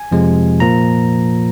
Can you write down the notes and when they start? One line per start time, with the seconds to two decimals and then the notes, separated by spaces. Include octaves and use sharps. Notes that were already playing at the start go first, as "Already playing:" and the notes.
Already playing: G#5
0.11 F2 C3 F3 G#3
0.60 A#2 F3 A#3 A#5